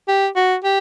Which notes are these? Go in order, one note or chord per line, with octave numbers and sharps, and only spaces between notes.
G4
F#4
G4